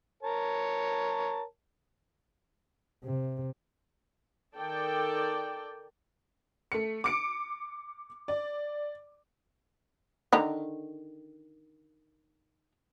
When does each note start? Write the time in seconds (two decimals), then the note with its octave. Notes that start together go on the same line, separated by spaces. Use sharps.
0.23 A#4 C#5 A5
3.04 C3
4.57 D#3 A4 D5 G5
6.72 A3 C#7
7.04 D6 C#7 D7
8.28 D5
10.33 D3 D#3 A#5